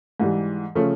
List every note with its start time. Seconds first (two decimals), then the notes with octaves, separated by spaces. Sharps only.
0.20 G#2 E3 G3
0.75 C#3 F3 A3 C#4